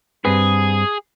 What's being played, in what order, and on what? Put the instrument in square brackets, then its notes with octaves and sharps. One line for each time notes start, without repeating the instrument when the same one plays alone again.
[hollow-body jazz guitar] G2 C4 B4 [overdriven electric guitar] G#4